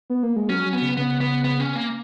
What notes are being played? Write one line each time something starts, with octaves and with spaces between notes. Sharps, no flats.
B3
A#3
G#3
F#3 C#4
F#3
B3
C#3
C#3 B3
B3
B3
C#4
A#3